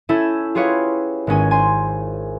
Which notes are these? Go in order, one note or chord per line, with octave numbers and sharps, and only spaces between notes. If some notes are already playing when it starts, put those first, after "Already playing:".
C#4 E4 A4 G6 G#6 E7
F4 G4 G#4 B4 C#5 F5
G#1 G#3 C#4 G#5
C5 G#5 C6